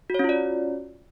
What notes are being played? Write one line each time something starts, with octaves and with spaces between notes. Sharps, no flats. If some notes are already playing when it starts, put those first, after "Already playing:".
C#4 F4 F#4 C#5 D5